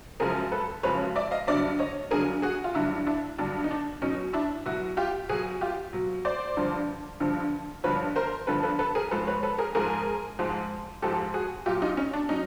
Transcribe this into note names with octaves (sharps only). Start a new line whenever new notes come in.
F#2 C#3 F3 G#3 G#4 A#4
A4 B4
F#2 C#3 F3 G#3 B4 C#5
D5 E5
D#5 F5
G2 D3 F#3 D5 E5
C#5 D#5
G2 D3 F#3 G#4 A#4
F#4 G#4
F4
G2 D3 F#3 E4 F#4
D4 E4
G2 D3 F#3 D4
D#4
D4
B2 F#3 C#4 D#4
D4 E4
B2 F#3 E4 F#4
F4 G4
B2 F#3 F#4 G#4
F4 G4
B2 F#3
C5 D5
G2 D3 F3
G2 D3 F3
G2 D3 F3 B4 C#5
A#4 C5
G2 D3 F3 A4 B4
A4 B4
A4 B4
G#4 A#4
G#2 F3 G#3 A4 B4
B4 C#5
A4 B4
G#4 A#4
G#2 F3 G#3 G#4 A#4
G#2 F3 G#3
G#2 F3 G#3 G4 A4
F#4 G#4
A#2 F#3 F4 G4
D#4 F4
C#4 D#4
D4
F#3 C#4 D#4